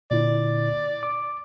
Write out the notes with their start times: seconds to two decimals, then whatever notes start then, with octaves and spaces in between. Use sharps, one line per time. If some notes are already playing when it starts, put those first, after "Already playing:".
0.11 A#2 D3 E4 D5
1.03 D6